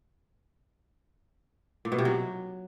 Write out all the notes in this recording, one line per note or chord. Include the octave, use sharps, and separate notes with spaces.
A#2
B2
C3
F#3